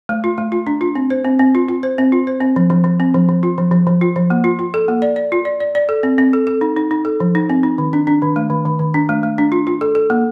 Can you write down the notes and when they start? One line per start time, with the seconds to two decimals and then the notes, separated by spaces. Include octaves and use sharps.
0.09 A3
0.24 F4
0.38 A3
0.52 F4
0.67 D4
0.81 F4
0.95 C4
1.10 C5
1.24 C4
1.39 C4
1.55 F4
1.69 F4
1.83 C5
1.98 C4
2.12 F4
2.27 C5
2.41 C4
2.56 F3
2.70 F3
2.84 F3
3.00 C4
3.14 F3
3.29 F3
3.43 F4
3.58 F3
3.71 F3
3.87 F3
4.01 F4
4.16 F3
4.30 A#3
4.44 F4
4.59 F4
4.74 A4
4.88 A#3
5.02 D5
5.16 D5
5.32 F4
5.45 D5
5.60 D5
5.75 D5
5.89 A4
6.03 C4
6.18 C4
6.33 A4
6.47 A4
6.61 D#4
6.77 D#4
6.91 D#4
7.05 A4
7.20 F3
7.35 D#4
7.50 C4
7.63 D#4
7.78 D#3
7.93 D4
8.07 D4
8.22 D#3
8.36 A3
8.50 D#3
8.65 D#3
8.79 D#3
8.94 D4
9.09 A3
9.23 A3
9.38 D4
9.52 F4
9.67 F4
9.81 A4
9.95 A4
10.10 A#3